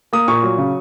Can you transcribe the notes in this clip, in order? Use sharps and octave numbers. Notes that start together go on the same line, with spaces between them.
A#3 D#6
A#2 C#6
F#3
C#3